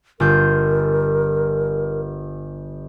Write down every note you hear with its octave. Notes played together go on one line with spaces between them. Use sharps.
G1 F4 A#4 G6